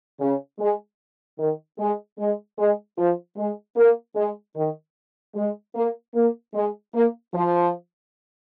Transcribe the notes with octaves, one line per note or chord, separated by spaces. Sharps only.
C#3
G#3
D#3
G#3
G#3
G#3
F3
G#3
A#3
G#3
D#3
G#3
A#3
A#3
G#3
A#3
F3